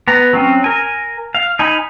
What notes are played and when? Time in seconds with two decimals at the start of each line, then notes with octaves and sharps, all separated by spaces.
0.08 B3 A#5
0.33 F#3 C4 C#4
0.64 A#4 G#5
1.35 F5
1.59 D#4 G#5 B5